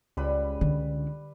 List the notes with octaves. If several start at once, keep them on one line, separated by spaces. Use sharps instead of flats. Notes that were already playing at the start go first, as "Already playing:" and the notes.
C#2 G3 B4 B5
D3